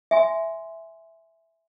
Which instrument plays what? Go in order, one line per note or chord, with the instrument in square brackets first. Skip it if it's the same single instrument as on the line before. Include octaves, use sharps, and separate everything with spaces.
[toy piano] E5 G#5 C6